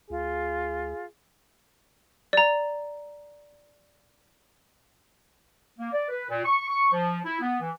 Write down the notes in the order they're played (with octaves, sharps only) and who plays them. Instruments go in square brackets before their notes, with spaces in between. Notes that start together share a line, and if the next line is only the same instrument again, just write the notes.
[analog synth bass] D2 [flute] F4 [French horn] G#4
[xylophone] D5 A#5
[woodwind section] A#3
D5
B4
A#2
C#6
C#6
F3
E4
B3
E3